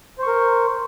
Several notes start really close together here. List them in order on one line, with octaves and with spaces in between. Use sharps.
C5 C#6 A#4